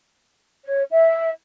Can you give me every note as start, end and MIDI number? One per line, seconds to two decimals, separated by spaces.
0.64 0.81 73
0.90 1.30 76